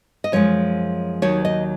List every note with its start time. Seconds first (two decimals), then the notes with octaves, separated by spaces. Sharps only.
0.24 D#5
0.32 F#2 F3 G#3 C#5
1.22 D#2 D#3 F#3 C#5
1.45 D#5